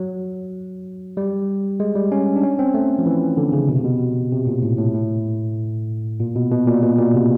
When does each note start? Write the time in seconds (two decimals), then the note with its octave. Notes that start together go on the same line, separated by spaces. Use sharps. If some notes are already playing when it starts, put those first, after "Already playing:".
Already playing: F#3
1.17 G3
1.80 G#3
1.95 G3
2.12 C#4
2.36 D4
2.43 C#4
2.59 C4
2.74 A3
2.98 F3
3.06 E3
3.37 D3
3.52 C#3
3.68 B2
3.76 C3
3.84 B2
4.32 C3
4.47 A#2
4.63 A2
4.78 A2
4.94 A2
6.20 A#2
6.36 B2
6.51 B2
6.67 A#2
6.83 B2
6.99 A#2
7.14 C3